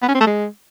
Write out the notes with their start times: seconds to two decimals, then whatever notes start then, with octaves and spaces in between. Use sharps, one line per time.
0.02 B3
0.08 C#4
0.14 C4
0.20 A3
0.27 G#3